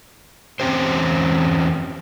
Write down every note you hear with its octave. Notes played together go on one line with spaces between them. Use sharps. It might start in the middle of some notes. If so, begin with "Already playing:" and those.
E2 C4 C#4 G4 C5